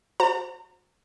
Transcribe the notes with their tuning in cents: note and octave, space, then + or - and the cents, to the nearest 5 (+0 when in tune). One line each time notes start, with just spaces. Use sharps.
F#4 -25 C5 +0 A#5 -40